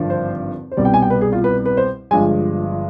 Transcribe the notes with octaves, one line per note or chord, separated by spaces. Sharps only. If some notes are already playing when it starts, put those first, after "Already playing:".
Already playing: G#1 G2 D3 F3
C5
C5
C2 B2 G3 D5
G5
G#5
G5
B4
G#4
F4
B4
B4
C5
G1 G2 F3 G#3 G#5